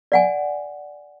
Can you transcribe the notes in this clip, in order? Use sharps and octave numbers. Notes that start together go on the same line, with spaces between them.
D5 F#5 G#5